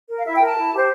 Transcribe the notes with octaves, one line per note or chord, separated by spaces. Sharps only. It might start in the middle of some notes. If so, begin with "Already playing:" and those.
A#4
F5
E4 E5
G5
A#4
A5
E4
G4 C5